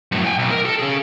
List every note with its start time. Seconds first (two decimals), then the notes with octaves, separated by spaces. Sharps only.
0.12 F#2 A2
0.25 G5 G#5
0.39 B1
0.51 A#4
0.65 A4
0.79 C#4 G#4